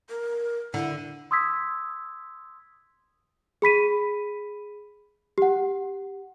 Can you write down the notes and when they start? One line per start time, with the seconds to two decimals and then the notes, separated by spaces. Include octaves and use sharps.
0.09 A#4
0.74 D3 E4
1.31 C6 D#6 E6 G#6 B6
3.62 G#4 B5 B6 D#7
5.38 G4 F#5